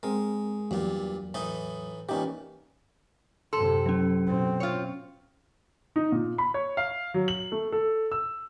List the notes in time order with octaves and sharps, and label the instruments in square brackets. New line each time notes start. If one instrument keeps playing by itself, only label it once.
[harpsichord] G#3 [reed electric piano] C4 A#4
[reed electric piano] E2 F#3 [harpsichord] G2 A#2
[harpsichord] A2 E3 D#4
[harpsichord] A#2 E3 [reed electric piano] C#4 D#4 G4
[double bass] F#2 C3 [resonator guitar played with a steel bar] A4 [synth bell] C6
[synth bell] F#3 C#4
[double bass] B2 C4
[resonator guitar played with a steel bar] F4 C#5
[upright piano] D#4
A#2
B5
C#5
F5
F#3
F#7
A3
A4
E6